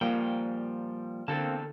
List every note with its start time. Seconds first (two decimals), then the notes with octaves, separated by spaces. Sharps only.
0.01 A#2 F3 G3 A#3 G5
1.28 E2 D3 A#3 C4 A4 A5